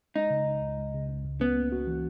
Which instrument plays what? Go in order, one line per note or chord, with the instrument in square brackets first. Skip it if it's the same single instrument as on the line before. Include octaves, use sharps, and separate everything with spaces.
[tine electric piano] G#3 [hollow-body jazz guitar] D#4
[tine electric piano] C#3
C#2
C#2
G#3
C#3
C#2
C#2
[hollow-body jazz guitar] B3 [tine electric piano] C#4
[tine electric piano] A#3
F#4
E3